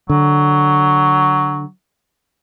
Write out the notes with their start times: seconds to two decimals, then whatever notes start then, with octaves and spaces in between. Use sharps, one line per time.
0.10 D3 F#3